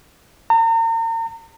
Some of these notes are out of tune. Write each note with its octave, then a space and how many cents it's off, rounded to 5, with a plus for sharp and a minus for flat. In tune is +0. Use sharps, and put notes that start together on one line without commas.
A#5 -40